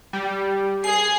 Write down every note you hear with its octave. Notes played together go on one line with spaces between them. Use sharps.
G3
G#4 C7